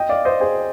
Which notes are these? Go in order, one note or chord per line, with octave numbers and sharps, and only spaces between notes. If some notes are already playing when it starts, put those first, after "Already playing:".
Already playing: D#5 G5
D5 F5
C5 D#5
G#4 C5